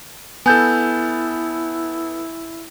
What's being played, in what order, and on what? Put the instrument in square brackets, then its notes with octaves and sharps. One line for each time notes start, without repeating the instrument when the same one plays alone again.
[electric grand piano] B3 A4 [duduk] E4 [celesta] G#5 G6